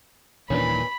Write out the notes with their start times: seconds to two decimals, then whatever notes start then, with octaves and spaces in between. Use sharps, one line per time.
0.50 D#1 A#2 D#3 E3 C#4 D4 B4 B5